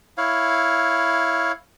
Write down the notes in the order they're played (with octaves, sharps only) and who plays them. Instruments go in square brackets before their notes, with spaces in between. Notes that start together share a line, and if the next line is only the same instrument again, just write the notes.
[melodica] E4 C#5 F5